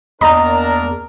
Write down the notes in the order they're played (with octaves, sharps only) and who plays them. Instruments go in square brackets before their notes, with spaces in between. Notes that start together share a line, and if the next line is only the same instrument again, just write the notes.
[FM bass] E2 [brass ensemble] A#3 D4 A#4 [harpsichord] D#5 A5 [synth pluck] A#5